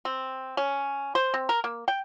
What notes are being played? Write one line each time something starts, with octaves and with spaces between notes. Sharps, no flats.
C4
C#4
C5
C4
A#4
A#3
G5